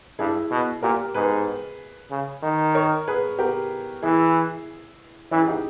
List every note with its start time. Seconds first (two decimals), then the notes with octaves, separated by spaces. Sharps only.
0.19 G2 E4 G#4
0.51 B2
0.82 A#2 G4 A#4
1.14 G#2 G#4 B4
2.11 C#3
2.42 D#3
2.75 A#4 C#5
3.08 G#4 B4
3.39 G4 A#4
4.03 E3 E4 G#4
5.31 E3 C#4 E4
5.41 G#4
5.47 D#4 G4